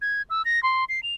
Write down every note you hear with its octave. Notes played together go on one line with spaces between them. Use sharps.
G#6
E6
A#6
C6
C7
F7